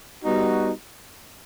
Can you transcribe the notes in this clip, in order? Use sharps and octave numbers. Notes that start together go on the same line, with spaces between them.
G3 B3 D#4 F#4